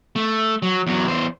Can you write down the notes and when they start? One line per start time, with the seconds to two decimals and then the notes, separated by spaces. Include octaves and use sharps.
0.16 A3
0.62 F#3
0.87 E2 F#3
1.07 E2 C5